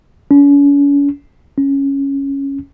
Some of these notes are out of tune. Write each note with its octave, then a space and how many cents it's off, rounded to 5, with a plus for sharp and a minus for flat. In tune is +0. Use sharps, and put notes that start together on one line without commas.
C#4 +40
C#4 -5